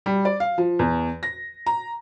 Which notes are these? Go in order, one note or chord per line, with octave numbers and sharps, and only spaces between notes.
G3
D5
F5
F3
E2
A#6
A#5